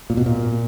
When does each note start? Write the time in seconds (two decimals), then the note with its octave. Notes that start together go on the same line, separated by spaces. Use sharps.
0.10 A#2
0.17 B2
0.26 A#2